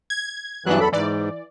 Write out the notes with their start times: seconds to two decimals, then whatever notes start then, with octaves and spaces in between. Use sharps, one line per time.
0.10 G#6
0.66 G2 E3 F#3 B3 D4 F#6
0.80 E2 A4 B5
0.92 G#2 E3 D5